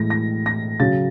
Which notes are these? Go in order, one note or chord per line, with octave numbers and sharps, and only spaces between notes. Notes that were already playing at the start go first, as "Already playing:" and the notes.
Already playing: A2 E3 G#3 A#6
A#6
A#6
C#3 F#3 A6